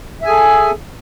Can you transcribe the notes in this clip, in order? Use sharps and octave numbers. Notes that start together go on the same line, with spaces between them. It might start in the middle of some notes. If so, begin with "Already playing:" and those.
G#4 A4 E5 G#5